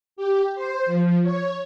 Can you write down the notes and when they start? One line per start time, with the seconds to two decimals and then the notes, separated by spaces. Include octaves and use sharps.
0.16 G4
0.55 C5
0.86 F3
1.23 C#5